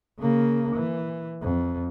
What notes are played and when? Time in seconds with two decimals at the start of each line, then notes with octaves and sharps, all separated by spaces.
0.19 C#3 A#3
0.75 E3
1.42 F2